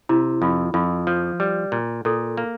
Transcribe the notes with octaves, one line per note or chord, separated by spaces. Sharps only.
C3 E4
F2 F4
F2 F4
F3
G3
A#2
A#2 A4
A#3